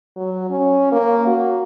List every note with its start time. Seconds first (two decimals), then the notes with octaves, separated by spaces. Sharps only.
0.17 F#3
0.50 C#4
0.92 A#3
1.27 F#4